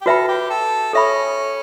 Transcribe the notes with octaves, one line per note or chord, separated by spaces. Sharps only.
G4
F#4 A4 B4 E5 G5 B5
G4
A4
C#4 A4 E5 B5